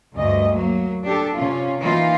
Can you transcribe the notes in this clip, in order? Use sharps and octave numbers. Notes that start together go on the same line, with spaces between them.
D2 G2 D#5
F#3 A#3
D4 G4 A4
C3 C#4 F4
E3 A#3 D#4 F4